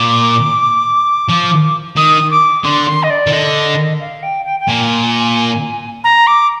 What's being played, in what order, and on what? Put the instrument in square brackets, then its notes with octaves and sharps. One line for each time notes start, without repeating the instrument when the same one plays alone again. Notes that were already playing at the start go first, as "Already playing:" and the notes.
Already playing: [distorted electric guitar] A#2 [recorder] D6
[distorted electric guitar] F3
[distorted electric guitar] D#3 [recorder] D#6
[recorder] D6
[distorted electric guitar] D3 [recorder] C6
[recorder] C6
D#5
D5
[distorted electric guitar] D#3
[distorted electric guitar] D3 [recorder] D#5
[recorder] F5
G5
G5
G5
[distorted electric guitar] A#2 [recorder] G#5
[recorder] A#5
D6